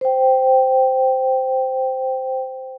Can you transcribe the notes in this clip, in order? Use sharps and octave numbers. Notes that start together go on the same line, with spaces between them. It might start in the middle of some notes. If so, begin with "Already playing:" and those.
C5 G5